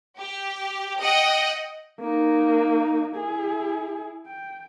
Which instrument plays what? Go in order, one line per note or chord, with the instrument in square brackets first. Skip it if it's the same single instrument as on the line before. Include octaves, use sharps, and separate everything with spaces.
[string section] G4
D#5 F#5 G5
[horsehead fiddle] A#3 D#4
E4 G#4
G5